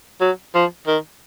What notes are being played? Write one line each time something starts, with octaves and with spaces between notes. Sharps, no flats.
F#3
F3
D#3